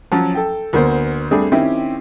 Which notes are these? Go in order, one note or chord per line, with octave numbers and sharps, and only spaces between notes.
F3 F#3 C#4
A4 G5
D2 A#3 B3 C5
G3 A3 C4 D4 G#4
D#3 C4 C#4 E4 G4